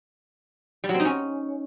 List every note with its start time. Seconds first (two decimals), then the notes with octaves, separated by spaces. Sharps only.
0.84 G3
0.89 F#3
0.94 C4
1.00 D#4
1.05 C#4